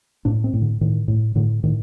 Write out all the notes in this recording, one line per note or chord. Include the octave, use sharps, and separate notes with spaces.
A2 D4
C4
A2
D3
A2 D#3
A2
A2 D3
A2 D#3